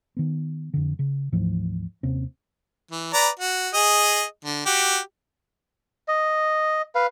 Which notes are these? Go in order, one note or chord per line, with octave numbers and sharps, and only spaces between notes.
D#3 B3
F2 D3
C#3
D2 G#2 E3 F3
D#2 C3 C4 C#4
E3
B4 D5 A#5
F#4
G#4 D#5
D3
F#4 G4
D#5
B4 F5